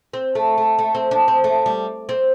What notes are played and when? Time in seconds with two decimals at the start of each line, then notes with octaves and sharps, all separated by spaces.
0.13 C4
0.35 A3
0.58 A3
0.79 A3
0.95 C4
1.11 D4
1.28 C4
1.44 A3
1.66 G3
2.09 C4